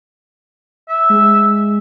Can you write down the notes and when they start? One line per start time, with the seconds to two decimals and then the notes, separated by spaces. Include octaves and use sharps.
0.88 E5
1.10 G#3